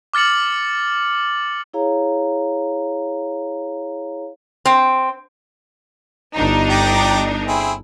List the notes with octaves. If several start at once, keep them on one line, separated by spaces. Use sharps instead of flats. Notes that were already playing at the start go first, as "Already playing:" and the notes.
D6 F6 A6 C#7 F#7
E4 G#4 C#5 F5 A#5
C4
G1 D4 D#4
G4 D5 A#5
C4 E4 G#4